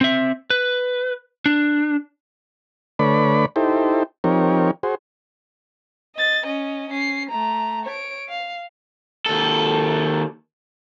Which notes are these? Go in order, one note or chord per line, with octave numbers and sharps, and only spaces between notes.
C4 E5
B4
D4
D3 A3 B4 C#5 D5 B5
D#4 E4 G4 A4 C5
F3 C4 D#4 G4 A#4 C#5
F#4 G#4 C5
D#5 A6
C#4 D#5
C#4 C7
A3 A#5
C#5 D7
F5
D#2 A4